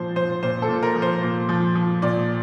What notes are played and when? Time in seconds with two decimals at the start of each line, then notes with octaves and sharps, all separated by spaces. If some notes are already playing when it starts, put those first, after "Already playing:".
Already playing: A#2 F3 C5
0.16 F3 C5
0.43 A#2 C5
0.62 A4
0.69 A#2
0.83 A#4
0.95 F3
1.02 C5
1.23 A#2
1.49 F3
1.75 F3
2.02 A#2 D5